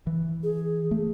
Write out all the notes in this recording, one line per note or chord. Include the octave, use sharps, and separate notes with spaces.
E3
G#4
A3